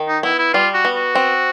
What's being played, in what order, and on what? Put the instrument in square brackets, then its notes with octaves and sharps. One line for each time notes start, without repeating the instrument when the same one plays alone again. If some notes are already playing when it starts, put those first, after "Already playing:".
Already playing: [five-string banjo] D#3
[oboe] D#4
[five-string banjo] B3 [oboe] E4
[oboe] E4
[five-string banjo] G3 [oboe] F4
[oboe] F#4
[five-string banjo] B3
[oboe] F#4
[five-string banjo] C4